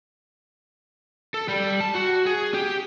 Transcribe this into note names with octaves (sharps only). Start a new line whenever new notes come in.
A4
G3
A5
F#4
G#4
G4